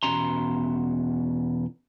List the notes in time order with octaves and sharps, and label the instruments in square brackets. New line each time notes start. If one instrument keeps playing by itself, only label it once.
[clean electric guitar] E2 B2 C#4 A#5 C6